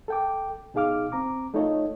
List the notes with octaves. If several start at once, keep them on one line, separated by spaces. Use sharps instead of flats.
A4 G5 D6
B2 D#4 G#4 F5 D6 F6
C4 A#5 D6
A3 D#4 F4 A4 C#5 D#5